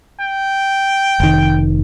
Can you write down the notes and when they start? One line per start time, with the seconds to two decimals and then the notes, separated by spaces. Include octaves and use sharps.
0.21 G5
1.20 F1 D#3